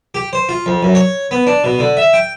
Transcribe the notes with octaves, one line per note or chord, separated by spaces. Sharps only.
G4
C5
F4
F2
F#2
C#5
B3
D4
B2
D3
E5
G5